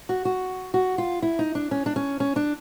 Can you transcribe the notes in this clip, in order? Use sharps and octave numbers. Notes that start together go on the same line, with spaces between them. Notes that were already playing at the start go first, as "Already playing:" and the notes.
F#4
F#4
F#4
F4
E4
D#4
D4
C#4
D4
C#4
C#4
D4